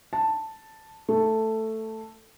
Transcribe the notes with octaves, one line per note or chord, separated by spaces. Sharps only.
A5
A3